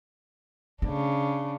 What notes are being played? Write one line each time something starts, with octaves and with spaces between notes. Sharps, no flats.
C#3 A3 D4